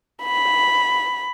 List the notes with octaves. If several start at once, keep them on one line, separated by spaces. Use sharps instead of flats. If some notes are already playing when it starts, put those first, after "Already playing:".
B5